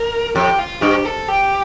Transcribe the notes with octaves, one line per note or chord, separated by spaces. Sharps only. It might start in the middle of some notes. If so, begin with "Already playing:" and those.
Already playing: A#4
F2 G4
F4
G2 G4
A4
G4